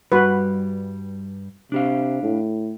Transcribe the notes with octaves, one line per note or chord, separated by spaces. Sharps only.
G2 G3 F#4 B4
C3 D4 G4 F5
A2